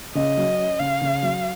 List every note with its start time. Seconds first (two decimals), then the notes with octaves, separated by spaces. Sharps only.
0.15 C#3 D#5
0.37 F#3
0.58 C#4
0.79 C#3 F5
1.01 C#3
1.23 F#3